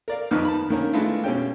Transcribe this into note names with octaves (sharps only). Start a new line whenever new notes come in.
A#4 D5 F5
F2 D#3 D#4 B4 F6
A5 B5
D3 D#3 A#3 C#4
G#3 A3 B3 D4 E4 F4
B2 C#4 G5